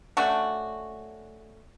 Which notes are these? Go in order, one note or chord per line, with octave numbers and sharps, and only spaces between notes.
A3 C#4 D4 F#4